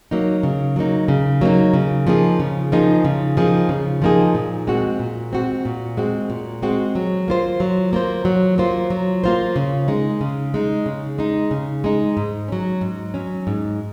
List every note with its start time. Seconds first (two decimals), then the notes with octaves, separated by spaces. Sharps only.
0.11 F#3 A#3 D#4
0.43 C#3
0.76 F#3 A#3 D#4
1.08 C#3
1.41 F#3 A#3 D#4
1.74 C#3
2.07 F3 A#3 D#4 G#4
2.40 C#3
2.72 F3 A#3 D#4 G#4
3.05 C#3
3.37 F3 A#3 D#4 G#4
3.69 C#3
4.02 F3 A#3 D#4 G#4
4.35 A#2
4.67 G#3 C4 F#4
4.99 A#2
5.32 G#3 C4 F#4
5.65 A#2
5.97 G#3 C4 F#4
6.30 A#2
6.63 G#3 C4 F#4
6.95 F#3
7.28 A#3 F4 C5
7.60 F#3
7.93 A#3 F4 C5
8.25 F#3
8.58 A#3 F4 C5
8.90 F#3
9.24 A#3 F4 C5
9.56 C#3
9.88 G#3 D#4
10.21 C#3
10.54 G#3 D#4
10.86 C#3
11.18 G#3 D#4
11.51 C#3
11.84 G#3 D#4
12.17 G#2
12.48 F#3 C#4
12.81 G#2
13.14 F#3 C#4
13.47 G#2